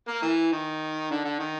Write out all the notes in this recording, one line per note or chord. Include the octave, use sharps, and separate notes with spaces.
A#3
E3
D#3
D3
D3
D#3